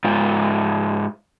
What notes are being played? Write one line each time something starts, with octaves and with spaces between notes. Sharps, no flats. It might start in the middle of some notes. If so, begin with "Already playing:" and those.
G#2 F4